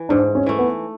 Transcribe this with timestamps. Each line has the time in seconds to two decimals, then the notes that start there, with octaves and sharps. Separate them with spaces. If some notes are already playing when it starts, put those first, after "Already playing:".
Already playing: E3
0.09 G#2 D4
0.35 C#4
0.46 E3 A3
0.59 B3